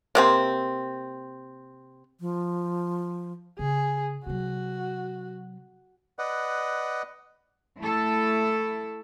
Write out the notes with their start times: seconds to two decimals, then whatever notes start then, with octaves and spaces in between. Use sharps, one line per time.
0.15 C3 A#3 C4
2.20 F3
3.59 C#3 G#4
4.26 C3 F#3 F#4
6.19 B4 D5 D#5 F#5
7.79 A3 E4 A4